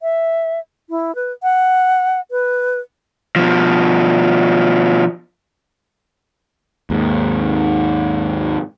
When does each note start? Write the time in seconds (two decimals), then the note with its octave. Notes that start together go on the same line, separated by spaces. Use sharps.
0.01 E5
0.90 E4
1.15 B4
1.43 F#5
2.31 B4
3.36 B2 F3
6.90 D#2 G#2